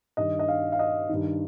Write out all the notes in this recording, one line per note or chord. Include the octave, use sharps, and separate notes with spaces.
G2 D#3 D#5
D#5
F5
F5
D#5
G2 D#3